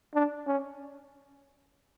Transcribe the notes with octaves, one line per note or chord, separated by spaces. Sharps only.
D4
C#4